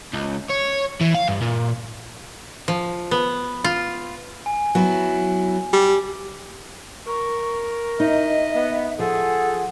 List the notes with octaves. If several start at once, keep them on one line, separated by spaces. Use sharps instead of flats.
C#2
C#5
E3
F5
G2
A#2
F3
B3
F4
G#5
F#3 B3 E4
G3
A#4 C#6
D#4 D#5 E5
B3
F3 G#4 A4 F#5